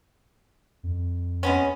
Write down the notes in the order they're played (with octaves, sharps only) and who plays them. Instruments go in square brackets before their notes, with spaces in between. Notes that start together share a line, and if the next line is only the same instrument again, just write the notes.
[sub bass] F2
[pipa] G#3 B3 C#4